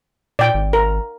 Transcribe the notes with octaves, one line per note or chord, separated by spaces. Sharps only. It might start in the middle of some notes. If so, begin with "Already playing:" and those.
A#2 D5 G5
G#1
A#4